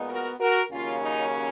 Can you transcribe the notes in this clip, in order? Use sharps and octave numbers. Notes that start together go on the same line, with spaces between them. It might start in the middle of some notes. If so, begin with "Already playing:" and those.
Already playing: A#2 G#3 B3 D#4
F#4 A#4
F#4 A#4
D#2 C#3 F#3 A#3 C#4 F4
D#4